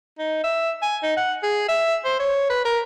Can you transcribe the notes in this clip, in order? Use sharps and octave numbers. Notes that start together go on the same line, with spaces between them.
D#4
E5
G#5
D#4
F#5
G#4
E5
C5
C#5
B4
A#4